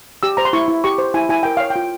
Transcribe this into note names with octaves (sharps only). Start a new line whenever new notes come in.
G4 E6
C5 A#5
C6
E4 C#6
E4
G4 C#6
C5
E4 G#5
E4 G#5
A#4 G5
C#5 F5
G5
F4